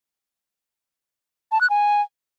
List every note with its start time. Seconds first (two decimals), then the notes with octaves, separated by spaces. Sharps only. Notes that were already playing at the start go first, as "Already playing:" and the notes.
1.52 A5
1.61 F#6
1.70 G#5